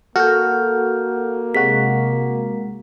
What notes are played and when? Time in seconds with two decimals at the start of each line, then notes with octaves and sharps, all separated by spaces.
0.16 A#3 F#4 A4 F6 G6
1.55 C3 G#3 F#4 B6